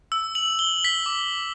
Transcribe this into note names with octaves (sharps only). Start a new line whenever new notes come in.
E6
F#7
G7
B6
D6